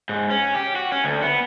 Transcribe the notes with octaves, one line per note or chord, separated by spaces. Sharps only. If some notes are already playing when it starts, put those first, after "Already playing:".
G#2
C#4
G4
F#4
C#4
D2
B3